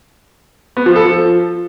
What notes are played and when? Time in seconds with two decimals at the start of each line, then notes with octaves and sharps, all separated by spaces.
0.77 B3
0.86 F3
0.96 A4
1.05 F3